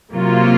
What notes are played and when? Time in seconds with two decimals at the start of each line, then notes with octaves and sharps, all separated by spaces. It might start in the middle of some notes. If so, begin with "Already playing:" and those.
0.13 C3 F#3 A#3 F4